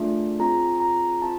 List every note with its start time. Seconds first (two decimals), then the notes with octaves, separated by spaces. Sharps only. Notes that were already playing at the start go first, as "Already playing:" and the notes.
Already playing: A3 D4 F4 G#4
0.39 C4 F4 G#4 A#5
0.80 A#5
1.22 C4 F4 A5